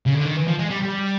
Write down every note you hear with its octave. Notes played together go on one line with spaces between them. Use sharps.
C#3
D3
D#3
E3
F3
G#3
G3
G3